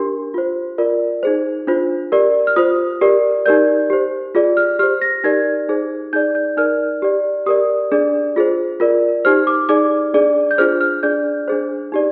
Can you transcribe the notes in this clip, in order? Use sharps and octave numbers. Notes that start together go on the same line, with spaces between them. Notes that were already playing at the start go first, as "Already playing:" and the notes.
Already playing: D4 G4 A#4 C6
F4 C5
F4 A#4 D5
D#4 G#4 C5
D4 F4 C5
G4 A#4 D5
F6
F4 C5 D#6
G4 A#4 D5
D#4 G4 A#4 D5 G6
G4 C5
F4 G#4 D5
F6
G4 C5 F6
A#6
D#4 G4 A#4 D5 G#6
D#4 G#4 C5
D#4 G#4 D5 G6
G6
D#4 A#4 D5 F6
G4 D5
G4 A#4 D5 D#6
D4 G#4 D5
F4 G#4 C5
F4 A#4 D5
D#4 G4 C5 F6
D6
D#4 G#4 D5 D6
D4 G#4 D5
G6
D4 F4 G#4 C5 F6
F6
D4 G#4 D5 G6
D4 G#4 C5
D#4 G4 D5